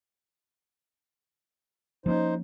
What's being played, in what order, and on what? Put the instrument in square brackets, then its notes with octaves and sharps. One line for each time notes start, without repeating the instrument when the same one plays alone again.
[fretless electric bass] F3 A#3 C#4 [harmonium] D#4 C5